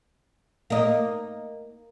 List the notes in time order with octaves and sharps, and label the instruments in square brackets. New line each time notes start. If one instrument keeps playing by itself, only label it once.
[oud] A#3 D#4